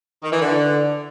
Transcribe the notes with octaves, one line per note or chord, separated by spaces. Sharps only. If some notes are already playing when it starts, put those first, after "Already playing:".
D#3
E3
D3